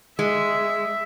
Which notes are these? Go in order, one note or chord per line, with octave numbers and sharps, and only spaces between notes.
G#3 E5